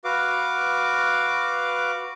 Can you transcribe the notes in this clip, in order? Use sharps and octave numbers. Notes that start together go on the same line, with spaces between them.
F#4 B4 F5 D6